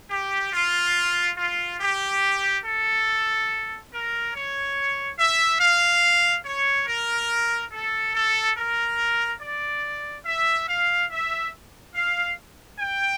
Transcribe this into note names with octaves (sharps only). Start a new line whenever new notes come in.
G4
F4
F4
G4
A4
A#4
C#5
E5
F5
C#5
A#4
A4
A4
A#4
D5
E5
F5
E5
F5
G5